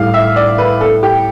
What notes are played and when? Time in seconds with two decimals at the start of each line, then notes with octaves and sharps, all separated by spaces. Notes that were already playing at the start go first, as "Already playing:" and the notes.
Already playing: A2 G3 F5
0.14 E5
0.36 D5
0.58 B4
0.81 A4
1.03 G4